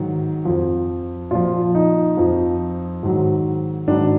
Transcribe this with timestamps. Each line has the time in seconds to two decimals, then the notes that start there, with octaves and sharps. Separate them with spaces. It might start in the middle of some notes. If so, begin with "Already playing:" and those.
Already playing: G#2 D#3 F#3
0.45 F2 F3
1.31 A#2 F3 F4
1.75 D#4
2.17 F2 F3
3.03 G#2 D#3 F#3
3.88 G#2 D#3 F#3 D4